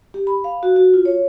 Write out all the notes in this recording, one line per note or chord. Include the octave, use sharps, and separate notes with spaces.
G4
B5
F5
F#4
F#4
F4
C#5